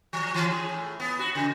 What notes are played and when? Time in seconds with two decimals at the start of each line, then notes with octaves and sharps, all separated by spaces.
0.13 F3
0.34 E3
0.51 G#4
0.69 A2
1.00 B3
1.19 F#4
1.35 C#3